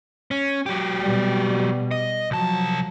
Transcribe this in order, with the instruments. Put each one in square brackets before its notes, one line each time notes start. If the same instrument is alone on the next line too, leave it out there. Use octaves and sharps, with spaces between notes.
[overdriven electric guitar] C#4
F#3 G4
[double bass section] B2 G3
[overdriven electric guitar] D#5
[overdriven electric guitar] C2 A5 [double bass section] F3 F#3